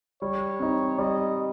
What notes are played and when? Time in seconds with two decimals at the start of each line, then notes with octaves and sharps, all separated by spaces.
0.22 G3 C#5
0.59 C4 D#4
0.99 G3 D#5